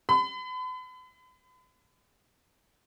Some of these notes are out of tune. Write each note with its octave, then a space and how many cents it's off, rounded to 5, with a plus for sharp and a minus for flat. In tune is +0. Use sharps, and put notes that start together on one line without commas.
B5 +40